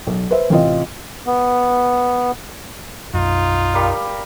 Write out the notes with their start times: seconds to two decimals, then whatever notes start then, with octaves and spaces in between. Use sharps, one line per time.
0.07 B1
0.31 B4 C5 E5
0.50 A1 C3 C4 F4 D#5
1.27 B3
3.14 B1 F#2 D#4 F4
3.74 G3 A#4 F5